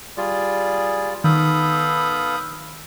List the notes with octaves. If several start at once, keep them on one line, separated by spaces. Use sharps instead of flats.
G3 F4 G#4 D5
D#3 B3 A4 F5 B5 D#6 G6